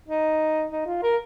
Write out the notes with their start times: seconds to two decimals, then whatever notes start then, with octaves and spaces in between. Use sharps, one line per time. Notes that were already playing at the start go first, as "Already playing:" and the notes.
0.08 D#4
0.71 D#4
0.86 F4
1.02 A#4